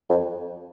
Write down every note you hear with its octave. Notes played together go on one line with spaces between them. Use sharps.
F2